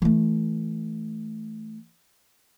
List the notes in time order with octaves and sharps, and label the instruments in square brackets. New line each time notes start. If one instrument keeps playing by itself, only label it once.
[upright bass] E3 A3